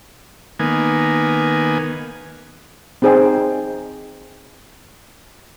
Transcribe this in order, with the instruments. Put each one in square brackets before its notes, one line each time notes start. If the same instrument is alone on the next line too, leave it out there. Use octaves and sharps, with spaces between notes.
[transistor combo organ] D#3 A#3 B3 G#5
[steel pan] C4 D#4 G#4 C5 D5 G5